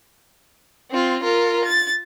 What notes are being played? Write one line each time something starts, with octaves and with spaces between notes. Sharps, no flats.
C4 F4
F4 A#4
A6